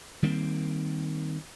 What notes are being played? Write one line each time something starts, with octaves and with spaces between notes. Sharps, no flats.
D#3 G3 A#3 C4